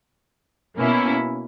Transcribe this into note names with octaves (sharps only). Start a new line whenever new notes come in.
B2 A#3 C#4 E4